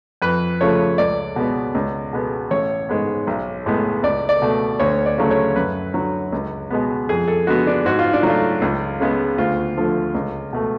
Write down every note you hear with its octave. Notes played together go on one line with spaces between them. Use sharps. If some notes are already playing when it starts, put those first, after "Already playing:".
F2 B4
C#3 F3 A3 C#5
C#2 D5
B2 G#3 B3
C#2
B2 G#3 B3
A1 C#5
G#2 G#3 B3
B1
A2 G#3 B3
C#2 D5
D5
B2 A3
D2 C#5
D5
C#3 F#3 A3
C#5
F#2 B4
D3 F#3
C#2
B2 G#3 B3
F2 G#4
A4
D3 G#3 B3 F#4
D4
G#2 F#4
F4
D4
F#3 A3 F4
C#2
C#3 G#3 B3
D2 F4
D3 F3 A3
C#2
B2 A3